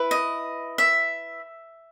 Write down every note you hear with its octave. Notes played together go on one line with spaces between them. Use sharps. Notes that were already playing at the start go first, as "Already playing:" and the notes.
Already playing: E4 B4
D#5
E5